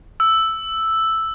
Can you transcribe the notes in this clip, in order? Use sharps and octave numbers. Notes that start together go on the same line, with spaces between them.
E6